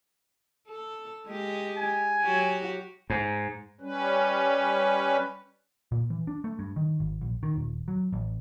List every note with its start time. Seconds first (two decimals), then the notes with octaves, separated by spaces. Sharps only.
0.69 A4
1.28 G#3 G4
1.77 G#5
2.23 F#3 F#4 G4
3.10 G#2
3.81 G3 C#4 B4
5.92 A#2
6.10 E3
6.27 D4
6.44 A3
6.59 G2
6.76 D#3
7.00 G#1
7.21 A#1
7.43 D#3
7.56 D#1
7.88 F#3
8.13 A1